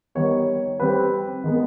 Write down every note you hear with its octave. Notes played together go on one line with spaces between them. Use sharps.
D#3 G3 B3 C#5
D#3 G3 C4 B4
D#3 G#3 B3